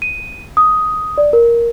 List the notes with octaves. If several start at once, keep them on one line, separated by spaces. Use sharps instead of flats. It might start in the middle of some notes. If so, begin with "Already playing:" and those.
D#7
D#6
D5
A#4